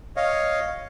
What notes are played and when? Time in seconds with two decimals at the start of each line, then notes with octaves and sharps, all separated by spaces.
0.17 C#5 D#5 F5